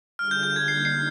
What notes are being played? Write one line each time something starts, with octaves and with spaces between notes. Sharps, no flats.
D3 G3 D4 F4 G#4 F6
G6
G6
G#6
D3 G3 A#3 D#4 C7
C7